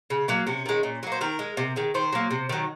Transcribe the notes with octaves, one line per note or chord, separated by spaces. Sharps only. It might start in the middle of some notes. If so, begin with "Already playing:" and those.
C#3
F#3 A#3
C3 C#4
D#3 G#3
A#2
F#3 A#3
C5
D#3 A#4
G#3
C3
D#3 G#3
D#3 C5
F#3 A#3
C3
D#3 F#3